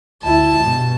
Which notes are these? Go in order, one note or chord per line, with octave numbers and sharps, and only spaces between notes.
D2 E4 A5
G2 B2